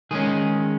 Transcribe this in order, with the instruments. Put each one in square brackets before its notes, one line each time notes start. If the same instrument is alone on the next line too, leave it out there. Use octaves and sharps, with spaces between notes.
[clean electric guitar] D#3 G#3 C#4 G#4